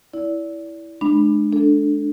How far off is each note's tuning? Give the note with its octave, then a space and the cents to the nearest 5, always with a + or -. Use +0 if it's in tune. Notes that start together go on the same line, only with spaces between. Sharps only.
E4 -5 D5 -30
G#3 +35 D4 +30 B5 +0
D4 +0 A4 +0